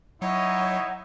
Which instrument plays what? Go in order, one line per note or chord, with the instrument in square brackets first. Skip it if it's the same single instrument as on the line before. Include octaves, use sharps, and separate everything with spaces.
[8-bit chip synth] F#3 [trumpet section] D#4 E4 [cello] C#5 D#5 [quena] F#5